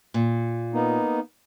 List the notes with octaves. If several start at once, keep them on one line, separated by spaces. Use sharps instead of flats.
A#2
A#3 B3 D#4